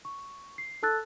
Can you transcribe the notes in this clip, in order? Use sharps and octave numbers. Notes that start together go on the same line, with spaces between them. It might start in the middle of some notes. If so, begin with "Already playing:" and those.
C#6
C7
A4 A5 E6 F#6 A6